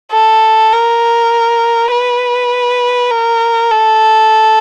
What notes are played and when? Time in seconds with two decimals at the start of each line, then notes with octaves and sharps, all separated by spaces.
0.12 A4
0.72 A#4
1.91 B4
3.11 A#4
3.71 A4